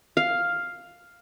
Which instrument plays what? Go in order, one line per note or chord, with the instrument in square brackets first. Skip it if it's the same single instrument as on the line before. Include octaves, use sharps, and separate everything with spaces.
[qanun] F5